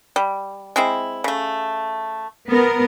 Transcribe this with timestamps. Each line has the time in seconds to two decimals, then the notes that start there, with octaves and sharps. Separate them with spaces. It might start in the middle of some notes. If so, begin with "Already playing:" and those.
0.16 G3
0.76 G#3 C4 E4
1.24 C#3 A3
2.49 B3 A#4